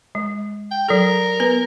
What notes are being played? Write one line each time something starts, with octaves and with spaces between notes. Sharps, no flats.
G#3
G5
F#3 A4 A#4
B3 B4